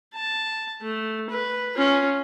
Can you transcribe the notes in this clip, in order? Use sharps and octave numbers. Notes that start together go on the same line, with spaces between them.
A5
A3
B4
C#4 F4